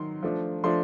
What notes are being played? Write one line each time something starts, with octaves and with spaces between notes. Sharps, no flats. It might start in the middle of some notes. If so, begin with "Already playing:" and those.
Already playing: D#3 F#3 C6
F3 A3 D4
F3 A3 D4 C6